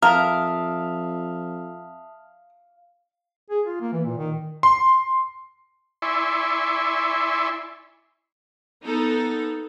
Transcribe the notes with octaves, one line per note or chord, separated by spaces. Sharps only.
F2 A#4 E5 F5 A5 D#6
G#4
F4
A#3
E3
A#2
D#3
C6
E4 D5 E5 G#5 C6 C#6
B3 D#4 A4